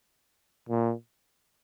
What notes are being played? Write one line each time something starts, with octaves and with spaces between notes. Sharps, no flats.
A#2